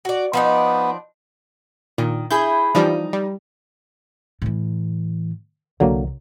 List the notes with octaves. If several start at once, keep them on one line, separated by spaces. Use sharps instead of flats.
F#4 D5
F3 B3 D4 D#4
A#2 D#3
E4 G#4 G6
E3 F3 G3 D#4
G3
A2 E3
C2 D3 F#3 A#3